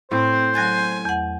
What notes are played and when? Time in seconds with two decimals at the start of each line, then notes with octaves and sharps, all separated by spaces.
0.11 A2 C4 C5
0.55 F#3 G#5 F#6 A6
1.05 E2 F#5